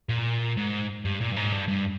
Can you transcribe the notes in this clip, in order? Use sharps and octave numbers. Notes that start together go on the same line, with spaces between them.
A#2
G#2
G2
A#2
G2
G#2
G2
G2